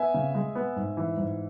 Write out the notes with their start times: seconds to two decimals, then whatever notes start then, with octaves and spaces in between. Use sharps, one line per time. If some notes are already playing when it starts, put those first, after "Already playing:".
Already playing: B3 E5 G#5
0.14 C#3
0.35 G#3
0.55 B3
0.76 G#2
0.97 E3
1.17 G#2